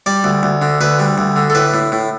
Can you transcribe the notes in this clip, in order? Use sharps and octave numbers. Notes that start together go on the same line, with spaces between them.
G3 D5
D2
D2
D3
D2 B4
G3
D2
D3
A4
A2 B4
A2
A2